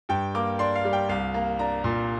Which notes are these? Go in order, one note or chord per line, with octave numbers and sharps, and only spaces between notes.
G2 G5
A#3 D6
D4 C6
F5
G3
G5
C2 F5
A#3
D4 A#5
A#2